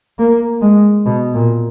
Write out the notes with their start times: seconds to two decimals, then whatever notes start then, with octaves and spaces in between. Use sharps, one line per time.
0.19 A#3
0.62 G#3
1.06 B2
1.34 A#2